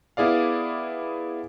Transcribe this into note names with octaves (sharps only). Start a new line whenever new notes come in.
B3 E4 G#4 D5 F5